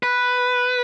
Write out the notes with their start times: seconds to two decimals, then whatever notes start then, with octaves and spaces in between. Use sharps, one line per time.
0.03 B4